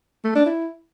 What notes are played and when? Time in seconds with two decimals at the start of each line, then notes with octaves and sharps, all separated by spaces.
0.24 A3
0.35 D4
0.46 E4